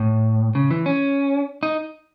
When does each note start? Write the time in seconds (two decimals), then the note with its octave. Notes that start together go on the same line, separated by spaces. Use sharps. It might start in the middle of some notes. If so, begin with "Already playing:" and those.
Already playing: A2
0.55 C#3
0.71 E3
0.86 C#4
1.63 D#4